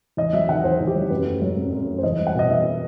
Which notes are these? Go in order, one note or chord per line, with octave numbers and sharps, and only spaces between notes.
E2 D#5
F#3 E5
D#3 F#5
E2 C5
E2
G4
F#3
F#2 B4
A3
F#3
F#2
F#2
A3
C5
E2 D#5
G3
F#5
B2 D#5
E2 E5